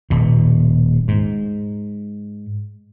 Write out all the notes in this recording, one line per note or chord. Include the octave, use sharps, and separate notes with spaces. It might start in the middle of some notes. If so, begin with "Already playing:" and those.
D#1 B2
G#2